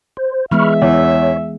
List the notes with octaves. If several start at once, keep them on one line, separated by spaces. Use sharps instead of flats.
C5
E3 G#3 B3 E5 B5 C#6 F6
E2 C#5